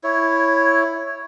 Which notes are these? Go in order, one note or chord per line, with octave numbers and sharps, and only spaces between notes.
E4 C#5